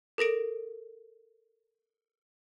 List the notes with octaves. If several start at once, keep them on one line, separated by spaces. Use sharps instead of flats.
A4 A#4 A#6 D7